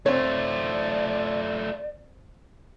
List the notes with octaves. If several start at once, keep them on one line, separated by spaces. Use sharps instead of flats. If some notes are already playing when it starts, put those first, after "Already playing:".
A3 C4 F4 C#5 D5